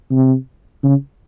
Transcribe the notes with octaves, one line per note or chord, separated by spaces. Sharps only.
C3
C#3